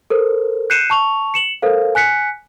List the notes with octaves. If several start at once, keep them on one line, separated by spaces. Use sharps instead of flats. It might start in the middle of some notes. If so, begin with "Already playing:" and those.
A4 A#4 C5
F#6 G6 C7 C#7 D#7 E7
A5 C#6 F7
C#7 E7 F#7
A4 A#4 C5 F5
G#5 F#6 B6 C#7